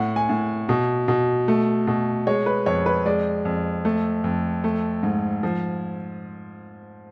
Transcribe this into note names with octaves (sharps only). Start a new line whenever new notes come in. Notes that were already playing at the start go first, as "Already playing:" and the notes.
Already playing: A2 F#5
G#5
A2
B2
B2
A3
B2
G#3 C#5
B4
F2 C#5
B4
G#3 D5
F2
A3
F2
A3
G#2
F3